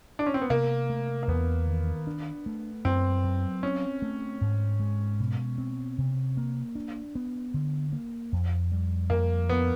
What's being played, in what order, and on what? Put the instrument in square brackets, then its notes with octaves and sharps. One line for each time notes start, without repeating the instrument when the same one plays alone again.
[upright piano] D4
C#4
C4
B3
[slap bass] C3 [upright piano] A#3
[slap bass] A3
[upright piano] A#3
[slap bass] E2 [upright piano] B3
[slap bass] D#3
D4
A3
[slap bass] F#2 [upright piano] C4
[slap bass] F#3
[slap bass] C4 [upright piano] C#4
[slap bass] A3
G#2
G#3
B2
C4
C3
A#3
D4
B3
D3
A#3
F2
G3
[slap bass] F2 [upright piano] A#3
[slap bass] F3 [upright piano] B3